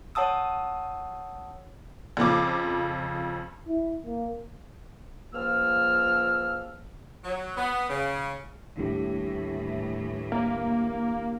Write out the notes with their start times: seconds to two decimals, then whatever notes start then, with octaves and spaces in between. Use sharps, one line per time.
0.15 C#5 F#5 A5 D#6 E6
2.17 F2 C#3 F3 D6
3.68 E4
4.06 A#3
5.34 C#2 F3 A#3 E6 F6
7.24 F#3
7.57 B3
7.90 C#3
8.77 D#2 A2 E3 G3 B3 D4 E4 G4
10.32 A#3